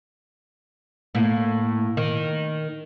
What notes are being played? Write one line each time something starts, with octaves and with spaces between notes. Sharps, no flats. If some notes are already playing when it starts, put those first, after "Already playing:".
A2 A#3
D#3